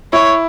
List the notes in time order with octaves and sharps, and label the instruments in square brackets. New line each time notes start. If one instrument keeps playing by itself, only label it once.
[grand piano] E4 [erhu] C#5